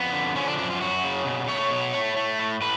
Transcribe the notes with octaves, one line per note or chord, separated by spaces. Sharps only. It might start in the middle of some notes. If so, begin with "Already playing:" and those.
Already playing: F2 B3
D3
F3 C#4
D4
F#2 D4
F4
F#2 F#4
C#3
B2
A3 C#5
B2
A3
A3
A2
A2 B4